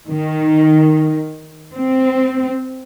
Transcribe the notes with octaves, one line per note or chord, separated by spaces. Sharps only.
D#3
C4